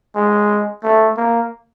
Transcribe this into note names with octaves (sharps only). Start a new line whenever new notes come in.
G#3
A3
A#3